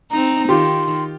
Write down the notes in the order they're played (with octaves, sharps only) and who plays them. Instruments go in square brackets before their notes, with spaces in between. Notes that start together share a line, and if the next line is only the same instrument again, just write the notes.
[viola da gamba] C4 D#4 [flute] A#5
[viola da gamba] D#3 [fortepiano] F4 G4 [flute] C6